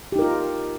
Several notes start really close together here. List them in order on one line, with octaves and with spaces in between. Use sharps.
G4 D#4 A#4 F4